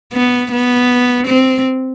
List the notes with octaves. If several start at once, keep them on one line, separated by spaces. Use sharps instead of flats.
B3
B3
C4